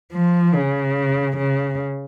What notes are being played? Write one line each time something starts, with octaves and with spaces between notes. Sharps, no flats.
F3
C#3
C#3